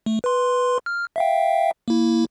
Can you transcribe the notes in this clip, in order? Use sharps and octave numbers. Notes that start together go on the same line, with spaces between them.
A3
B4 C6
F6
E5 F5 G5
A#3 E4